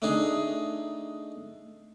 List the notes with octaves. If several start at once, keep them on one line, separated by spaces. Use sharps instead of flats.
A3 D4 D#4 G#4